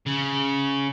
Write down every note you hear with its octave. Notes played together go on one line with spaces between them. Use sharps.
C#3